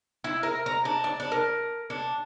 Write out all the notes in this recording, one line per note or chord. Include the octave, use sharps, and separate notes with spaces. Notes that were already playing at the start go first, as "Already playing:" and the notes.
E4
A#4
A#5
D4
D5
D4
A#4
D4